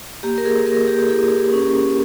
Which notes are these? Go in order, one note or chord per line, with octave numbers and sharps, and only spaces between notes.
A#3 G4
A#4
G#4
A#3 A#4
G4
E4 G#4
C#4